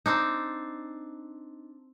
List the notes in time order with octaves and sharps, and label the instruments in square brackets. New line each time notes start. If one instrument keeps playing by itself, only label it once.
[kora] C4 D4 D#4